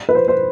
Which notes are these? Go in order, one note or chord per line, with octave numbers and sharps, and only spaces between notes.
B4
C5
C5